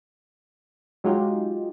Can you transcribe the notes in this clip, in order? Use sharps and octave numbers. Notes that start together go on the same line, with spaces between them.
F#3 G#3 D#4 F4 G4